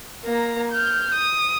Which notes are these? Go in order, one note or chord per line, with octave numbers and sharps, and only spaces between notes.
A#3 A#5
F6 G6
D#6